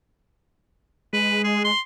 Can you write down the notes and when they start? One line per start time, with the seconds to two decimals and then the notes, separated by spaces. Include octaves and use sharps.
1.13 G#3 B4
1.44 G#4
1.64 C6